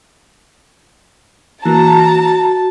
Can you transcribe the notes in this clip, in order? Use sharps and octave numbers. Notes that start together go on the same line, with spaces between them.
E3 A#3 F#4 A5 A#5